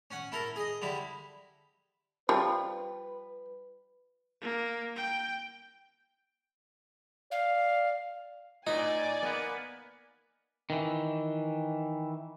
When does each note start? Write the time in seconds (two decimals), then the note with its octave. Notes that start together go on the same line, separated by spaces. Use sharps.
0.11 C#4 F#5
0.32 E4 A4 A#4
0.56 G#4 D#5
0.82 D3 G3 E4
2.29 F3 G3 B4
4.42 A#3
4.96 G5
7.31 D5 F5
8.67 A2 D#4 D5 G#5
9.23 A#3 B3
10.70 D#3 E3